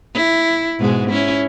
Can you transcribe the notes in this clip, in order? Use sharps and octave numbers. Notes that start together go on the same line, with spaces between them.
E4
G#2 B2 G#3
C#4 E4